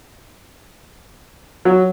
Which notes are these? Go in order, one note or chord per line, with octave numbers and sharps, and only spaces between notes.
F#3